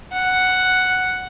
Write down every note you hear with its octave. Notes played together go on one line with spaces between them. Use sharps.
F#5